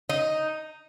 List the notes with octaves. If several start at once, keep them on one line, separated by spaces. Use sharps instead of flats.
D#4